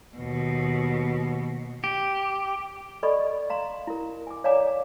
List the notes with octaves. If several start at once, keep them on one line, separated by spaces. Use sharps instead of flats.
D#2 B2
G4
A4 D5 D#5 B5 C#6
F5 A#5 C6
E4 A#4
G#5 D6
C#5 D5 F5 G#5 A#5 D6